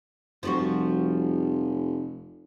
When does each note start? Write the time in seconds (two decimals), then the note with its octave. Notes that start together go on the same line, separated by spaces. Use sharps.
0.43 F1 F3 G3 F#4